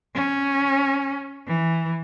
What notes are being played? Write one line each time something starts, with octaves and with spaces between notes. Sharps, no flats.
C#4
E3